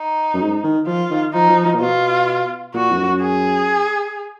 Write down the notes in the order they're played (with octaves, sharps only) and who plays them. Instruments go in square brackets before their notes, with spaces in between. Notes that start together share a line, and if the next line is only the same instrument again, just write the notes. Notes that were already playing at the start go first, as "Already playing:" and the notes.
Already playing: [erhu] D#4
[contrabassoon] F#2
G#2
D#3
[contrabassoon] F3 [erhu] F4
[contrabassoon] D#3
[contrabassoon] F3 [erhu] D#4
[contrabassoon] F3
F3
A#2
[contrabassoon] B2 [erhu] F4
[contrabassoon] A#2 [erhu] F#4
[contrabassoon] F2
F#2
[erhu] G#4